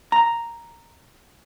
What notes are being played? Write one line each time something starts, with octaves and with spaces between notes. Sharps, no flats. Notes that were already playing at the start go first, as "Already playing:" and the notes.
A#5